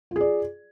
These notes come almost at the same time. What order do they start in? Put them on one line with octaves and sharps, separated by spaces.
F4 G#4 D5